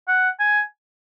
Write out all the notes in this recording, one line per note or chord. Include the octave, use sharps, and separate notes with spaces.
F#5
G#5